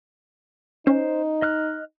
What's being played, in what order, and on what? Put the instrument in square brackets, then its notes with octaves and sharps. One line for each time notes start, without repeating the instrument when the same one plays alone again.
[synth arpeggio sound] C#4 [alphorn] D#4 [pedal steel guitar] C5
[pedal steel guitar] D#5 F6 F#6